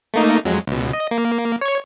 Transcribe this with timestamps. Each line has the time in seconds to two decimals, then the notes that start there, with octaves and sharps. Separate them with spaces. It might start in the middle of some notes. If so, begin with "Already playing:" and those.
0.14 A3 A#3 D#4
0.45 F2 F#3 G#3
0.67 C#2 B2
0.93 D#5
1.11 A#3
1.61 C#5 C#6